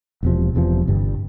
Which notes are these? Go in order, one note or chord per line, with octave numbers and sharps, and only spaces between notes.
E1 E2 C3 F3
E1 E2 C3 F3
G1 G2 G3